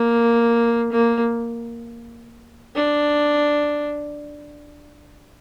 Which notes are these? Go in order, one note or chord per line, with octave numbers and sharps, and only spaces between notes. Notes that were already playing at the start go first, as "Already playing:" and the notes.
Already playing: A#3
A#3
D4